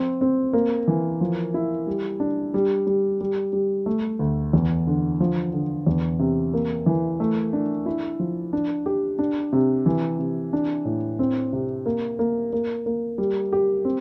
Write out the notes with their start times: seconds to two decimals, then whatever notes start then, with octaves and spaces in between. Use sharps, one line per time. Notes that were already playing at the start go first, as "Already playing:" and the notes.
Already playing: F3 C4
0.21 C4
0.53 A#3
0.88 E3
1.21 F3
1.54 E4
1.87 G3
2.20 D4
2.54 G3
2.87 G3
3.21 G3
3.53 G3
3.86 A3
4.19 D2
4.53 E2
4.87 D3
5.20 F3
5.53 D3
5.87 E2
6.19 C3
6.54 A#3
6.86 E3
7.20 A3
7.53 D4
7.86 E4
8.19 F3
8.53 D4
8.86 G4
9.19 D4
9.53 C3
9.86 E3
10.19 C3
10.53 D4
10.85 A2
11.19 C4
11.53 C3
11.86 A#3
12.19 A#3
12.53 A#3
12.86 A#3
13.18 G3
13.53 G4
13.85 C4